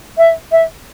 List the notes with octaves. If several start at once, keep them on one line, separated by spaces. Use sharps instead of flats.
E5
E5